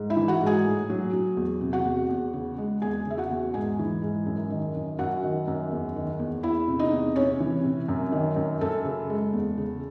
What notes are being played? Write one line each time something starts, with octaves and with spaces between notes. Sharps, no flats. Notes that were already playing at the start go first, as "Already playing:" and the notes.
Already playing: G#2
E4 E5
E3
F#4 F#5
G#2
G#4 G#5
A2
F#3
F#3
E2
C3
F#4 F#5
E2
E2
C#3
G#3
E2 G#4 G#5
C#3 E5
F#4 F#5
E2
G#2 G#4 G#5
E3
G#2
F#2
D#3
F#2
F#2 F#4 F#5
D#3
F#2
E2
D#3
E2
E2 E4 E5
C3
D#4 D#5
E2
C3 C#4 C#5
E3
C3
F#2
D#3
F#2
F#2 A4
C#3
G#3
E2
C#3